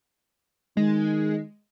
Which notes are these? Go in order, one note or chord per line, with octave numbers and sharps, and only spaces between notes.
D#3 G#3